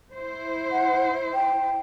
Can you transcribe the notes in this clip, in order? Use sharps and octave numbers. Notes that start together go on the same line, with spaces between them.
E4 C5
F#5
G5